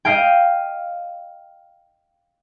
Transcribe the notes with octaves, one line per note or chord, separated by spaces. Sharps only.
D#5 F5 G5